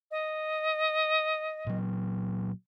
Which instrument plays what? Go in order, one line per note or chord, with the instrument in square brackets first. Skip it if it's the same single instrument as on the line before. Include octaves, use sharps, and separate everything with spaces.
[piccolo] D#5
[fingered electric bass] A#2 F#3